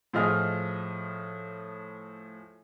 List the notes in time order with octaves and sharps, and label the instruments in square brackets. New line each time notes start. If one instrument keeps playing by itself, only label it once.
[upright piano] A2 F3 F4 G#4 D#5 F6